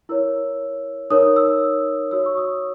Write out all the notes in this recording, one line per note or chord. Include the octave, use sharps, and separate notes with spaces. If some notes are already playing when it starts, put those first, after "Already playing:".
E4 A#4 C#5 E6
D#4 A#4 C#5 D#6
E6
F#4 C#5 E6
C#6
D#6